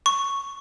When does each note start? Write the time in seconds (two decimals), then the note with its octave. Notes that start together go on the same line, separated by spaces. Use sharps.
0.06 C#6